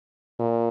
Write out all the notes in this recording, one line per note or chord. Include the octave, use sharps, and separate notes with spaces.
A#2